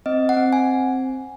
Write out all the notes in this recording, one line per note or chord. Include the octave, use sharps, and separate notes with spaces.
C4 D#5
F#5
C4
G#5